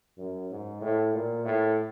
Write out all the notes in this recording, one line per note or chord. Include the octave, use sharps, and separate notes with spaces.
F#2
G#2
A2
A#2
A2